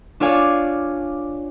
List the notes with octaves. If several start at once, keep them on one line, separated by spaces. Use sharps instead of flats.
D4 F4 C#5 D5 F5 G#5